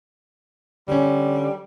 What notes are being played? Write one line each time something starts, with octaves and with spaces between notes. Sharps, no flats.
D3 G3 C#4